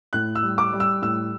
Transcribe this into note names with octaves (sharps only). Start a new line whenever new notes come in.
A2 F#6
E6
G3
D6
G3
E6
A2 E6